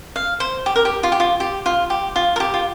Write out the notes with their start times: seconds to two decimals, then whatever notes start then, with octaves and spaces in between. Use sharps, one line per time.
0.16 F5
0.40 C5
0.66 G4
0.76 A#4
0.85 G4
1.03 F4
1.12 G4
1.20 F4
1.40 G4
1.66 F4
1.90 G4
2.16 F4
2.36 A#4
2.40 G4
2.54 F4